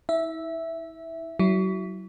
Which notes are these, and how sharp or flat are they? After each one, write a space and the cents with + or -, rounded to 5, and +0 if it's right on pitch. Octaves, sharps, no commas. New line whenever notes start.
E4 -40 E5 +0
F#3 +35 E4 +0